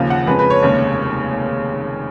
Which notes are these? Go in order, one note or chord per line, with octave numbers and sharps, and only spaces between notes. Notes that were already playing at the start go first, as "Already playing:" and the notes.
Already playing: D#2 C#3 F3 F5
F#5
F2 C#3 G#3 B4
B4
C#5
F1 D#2 C#3 G#3